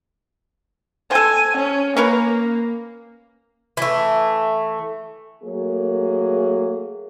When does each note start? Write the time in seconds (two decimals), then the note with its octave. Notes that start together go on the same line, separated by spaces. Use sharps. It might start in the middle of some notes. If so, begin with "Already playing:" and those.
1.11 A4 C5 G#5
1.57 C#4
1.97 A#3 C#4 A#4 B4
3.77 E3 A3
5.43 F#3 A3 A#3 G#4